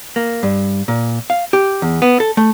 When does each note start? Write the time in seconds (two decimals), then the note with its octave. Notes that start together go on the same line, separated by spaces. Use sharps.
0.16 A#3
0.43 G2
0.88 A#2
1.30 F5
1.53 G4
1.82 E2
2.02 B3
2.20 A4
2.37 A3